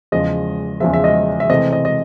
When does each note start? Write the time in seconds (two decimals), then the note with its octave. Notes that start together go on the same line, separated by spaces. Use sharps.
0.12 E2 C#3 F3 G#3 D#5
0.80 E2 C#3 F3 G#3 E5
0.93 E5
1.04 D#5
1.40 E5
1.49 C3 E3 A3 C4 D#5
1.73 D#5
1.85 D#5